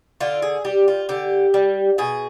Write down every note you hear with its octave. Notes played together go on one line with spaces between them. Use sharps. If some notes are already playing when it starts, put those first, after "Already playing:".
D3 F4
G#4
G3 G4
F4
D3 G4
G3
B2 G#4